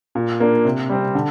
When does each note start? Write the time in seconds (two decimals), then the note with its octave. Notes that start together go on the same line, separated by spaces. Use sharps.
0.15 A#2
0.40 A#3 D4
0.65 C3
0.90 G3 C4
1.15 D3